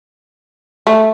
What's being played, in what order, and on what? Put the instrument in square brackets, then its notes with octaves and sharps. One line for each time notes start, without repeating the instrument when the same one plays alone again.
[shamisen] A3